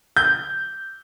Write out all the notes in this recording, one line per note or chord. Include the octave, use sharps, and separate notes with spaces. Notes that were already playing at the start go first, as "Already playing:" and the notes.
G6